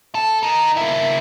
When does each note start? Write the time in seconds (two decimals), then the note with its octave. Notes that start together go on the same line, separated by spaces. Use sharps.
0.15 A4
0.43 D#4 A#4
0.77 A#3 E4